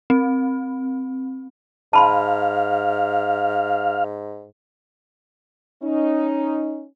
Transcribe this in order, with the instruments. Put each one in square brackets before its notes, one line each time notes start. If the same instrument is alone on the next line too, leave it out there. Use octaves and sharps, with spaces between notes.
[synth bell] C4
[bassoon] G#2 [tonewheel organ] F5 [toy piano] A5 B5 C6
[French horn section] C#4 D#4